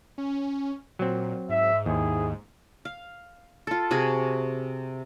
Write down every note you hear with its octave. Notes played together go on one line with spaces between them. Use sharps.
C#4
A#2 F#3 C4
G#2 E5
D#2 E4 G#4
F5
F4 A4
C3 F#4 G#4 B5